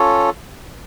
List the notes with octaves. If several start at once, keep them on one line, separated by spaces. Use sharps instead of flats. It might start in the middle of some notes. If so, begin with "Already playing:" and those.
Already playing: C#4 F4 A4 C#5